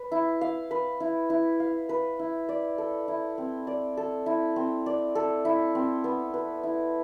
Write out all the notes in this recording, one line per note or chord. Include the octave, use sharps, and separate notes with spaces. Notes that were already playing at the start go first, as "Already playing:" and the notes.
Already playing: B4
E4
F5
B4
E4
E4
F5
B4
E4
D5
A4
E4
C4
D5
A4
E4
C4
D5
A4
E4
C4
B3
B4
E4